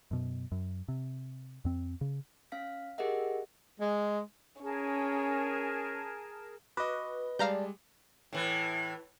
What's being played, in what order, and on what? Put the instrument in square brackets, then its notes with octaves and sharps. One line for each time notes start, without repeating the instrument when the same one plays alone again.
[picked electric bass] F#2 B2
F#2
C3
F2 C4
C#3
[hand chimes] C#4 F5 B6
G4 G#4 A#4 D#5 E5 F#5
[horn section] G#3
[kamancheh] C#4 [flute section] G#4 A#4 A5
[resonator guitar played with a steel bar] F#4 [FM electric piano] B4 [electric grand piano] D#5 D6
[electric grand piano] G3 G#3 [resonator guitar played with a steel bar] D5 A5 [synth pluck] F5 A#5 G6
[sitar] A2 E3